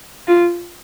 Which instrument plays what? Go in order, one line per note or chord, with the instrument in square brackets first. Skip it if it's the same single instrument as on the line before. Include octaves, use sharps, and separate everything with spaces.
[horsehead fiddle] F4